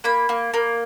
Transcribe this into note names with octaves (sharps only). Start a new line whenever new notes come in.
A#3 B5
A#3
A#3